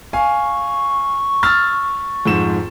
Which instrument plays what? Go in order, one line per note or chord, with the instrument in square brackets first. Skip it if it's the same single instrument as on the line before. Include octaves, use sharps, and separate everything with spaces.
[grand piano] F5 G#5 [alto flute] C#6
[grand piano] E6 F6 A6
F2 G#2 E7